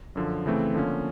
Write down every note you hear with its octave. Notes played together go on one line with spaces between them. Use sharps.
F#2 D3 F3
C#3 E3 A3 C4
D3 F3 A#3 C#4